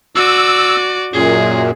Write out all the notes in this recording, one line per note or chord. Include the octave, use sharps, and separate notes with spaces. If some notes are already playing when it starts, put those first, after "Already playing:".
F#4 D5 E6
F#2 A#2 G#4